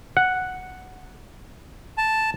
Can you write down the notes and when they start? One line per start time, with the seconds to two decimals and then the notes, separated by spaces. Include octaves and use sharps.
0.17 F#5
1.98 A5